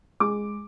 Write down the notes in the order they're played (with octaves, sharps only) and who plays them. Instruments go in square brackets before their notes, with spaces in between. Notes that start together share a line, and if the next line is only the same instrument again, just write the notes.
[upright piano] G#3 D6